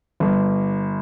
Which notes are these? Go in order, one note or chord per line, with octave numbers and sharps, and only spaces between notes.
G1